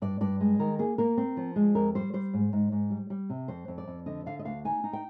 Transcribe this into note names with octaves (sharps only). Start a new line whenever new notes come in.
G2 D5
G2 D5
G#3
D#3 A#4
A#3 G#4
A#3 A#4
C4
F3
G#3
F2 A#4
G3 C5
G3 C5
G#2
G#2
G#2
G3
G3
C3
F2 C5
F2
D5
F2
D3 D#5
D3 F5
D#5
D2 F5
D#4 G#5
D#4
G5